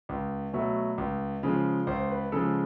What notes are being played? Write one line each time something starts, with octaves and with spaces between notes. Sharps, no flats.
C#2
B2 F#3 A3
C#2
C#3 F3 G#3
C#2 C5
B4
C#3 F3 G#3 A4